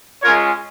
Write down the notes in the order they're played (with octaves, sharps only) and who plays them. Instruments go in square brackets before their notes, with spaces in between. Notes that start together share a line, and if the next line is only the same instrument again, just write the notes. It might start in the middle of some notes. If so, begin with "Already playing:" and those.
[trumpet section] G#3 C#4 F4 A#4 C#5